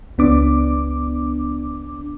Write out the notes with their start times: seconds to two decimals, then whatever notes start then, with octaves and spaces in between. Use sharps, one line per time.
0.18 C#2 B3 D4 D6